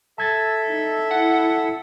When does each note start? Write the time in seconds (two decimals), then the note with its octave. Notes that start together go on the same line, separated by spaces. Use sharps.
0.18 A4 E5 A5 G#6 A6
0.67 D#4
1.11 E4 F#5